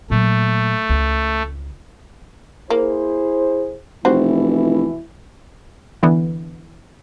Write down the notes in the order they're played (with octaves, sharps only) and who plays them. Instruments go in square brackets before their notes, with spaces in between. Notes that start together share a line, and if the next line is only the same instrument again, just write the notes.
[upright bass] A#2 F#3 [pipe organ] A3
[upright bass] C#2
[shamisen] A#3 [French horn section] E4 G#4 C5
[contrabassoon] F1 [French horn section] B2 E3 E4 [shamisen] G3 F#4 C5
[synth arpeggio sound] D3 E3 B3